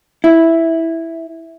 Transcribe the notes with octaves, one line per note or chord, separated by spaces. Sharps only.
E4